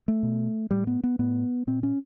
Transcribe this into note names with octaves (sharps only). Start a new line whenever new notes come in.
A3
B2
A2 G3
B3
B3
A2 B3
A#2 C4
C#4